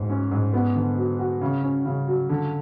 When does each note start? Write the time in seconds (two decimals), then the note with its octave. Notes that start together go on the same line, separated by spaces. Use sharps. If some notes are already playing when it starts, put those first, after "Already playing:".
Already playing: G#2
0.09 C#4
0.31 G#2
0.54 B3
0.75 D3
0.97 F#3
1.19 F#4
1.41 C#3
1.63 C#4
1.85 C#3
2.07 F#3
2.29 D3